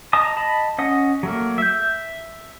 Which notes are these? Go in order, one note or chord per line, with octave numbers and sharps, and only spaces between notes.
D#5 A5 A#5 D#6
D#5 A5 B5
C#4 D#5 F#5 D#6
F#3 A3 A#3
E5 G6